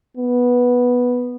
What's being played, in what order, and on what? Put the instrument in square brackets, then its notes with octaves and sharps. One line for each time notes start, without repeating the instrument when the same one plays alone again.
[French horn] B3